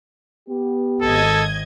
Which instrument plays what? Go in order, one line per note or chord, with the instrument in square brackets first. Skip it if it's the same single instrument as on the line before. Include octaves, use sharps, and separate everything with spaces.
[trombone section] B3 G4
[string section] G#1 D#5 G#6 [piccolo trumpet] A4